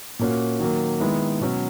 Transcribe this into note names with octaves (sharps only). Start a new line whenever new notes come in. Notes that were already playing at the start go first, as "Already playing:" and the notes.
A#2 A#3 C#4 F#4
D#3 F#3 A#3
D#3 G#3 B3 E4
B2 F#3 C#4